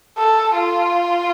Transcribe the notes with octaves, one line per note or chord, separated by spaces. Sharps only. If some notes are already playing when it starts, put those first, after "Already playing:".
A4
F4